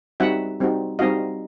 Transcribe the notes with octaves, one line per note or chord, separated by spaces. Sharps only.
G3 C4 D#4 F#4 E5 F#5
G3 C4 D#4 F#4
G3 C4 D#4 F#4 D#5 F5